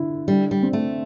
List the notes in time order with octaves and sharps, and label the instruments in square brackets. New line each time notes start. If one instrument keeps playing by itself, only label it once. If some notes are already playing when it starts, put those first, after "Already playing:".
Already playing: [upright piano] D3 E4
[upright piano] D3 [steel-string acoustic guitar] G3
[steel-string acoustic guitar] G3
[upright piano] C4
[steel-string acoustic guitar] A3